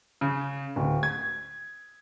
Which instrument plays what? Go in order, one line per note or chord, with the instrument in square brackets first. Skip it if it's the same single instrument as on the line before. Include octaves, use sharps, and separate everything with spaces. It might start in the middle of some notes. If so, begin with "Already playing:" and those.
[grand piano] C#3
D1
G#6